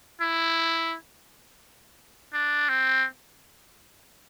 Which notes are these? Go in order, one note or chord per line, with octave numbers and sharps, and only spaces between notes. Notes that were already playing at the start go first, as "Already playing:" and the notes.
E4
D4
C4